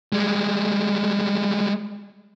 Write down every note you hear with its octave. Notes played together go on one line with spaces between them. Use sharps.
G3 G#3